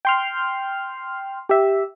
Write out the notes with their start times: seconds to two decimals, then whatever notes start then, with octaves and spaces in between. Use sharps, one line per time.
0.05 G5 C6 F6
1.49 G4 E5